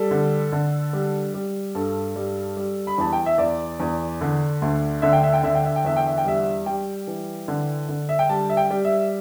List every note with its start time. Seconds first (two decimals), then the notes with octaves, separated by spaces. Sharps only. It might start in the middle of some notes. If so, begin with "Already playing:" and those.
Already playing: G3 A4
0.11 D3
0.52 D3
0.93 G3
1.34 G3
1.75 G2 A4
2.16 G3
2.57 G3
2.87 B5
2.98 E2 A5
3.13 G5
3.26 E5
3.38 E2 D5
3.80 E2
4.21 D3
4.62 D2
5.02 D3 E5
5.13 G5
5.23 E5
5.33 G5
5.43 D3 E5
5.55 G5
5.65 E5
5.76 G5
5.84 E2 E5
5.96 G5
6.07 E5
6.18 G5
6.25 G3 E5
6.66 G3 G5
7.07 E3
7.48 D3
7.89 D3
8.09 E5
8.19 G5
8.29 G3 A5
8.49 E5
8.57 G5
8.71 G3
8.85 E5